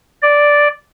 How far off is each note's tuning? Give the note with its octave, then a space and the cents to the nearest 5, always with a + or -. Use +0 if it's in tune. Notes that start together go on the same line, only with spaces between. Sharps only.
D5 -5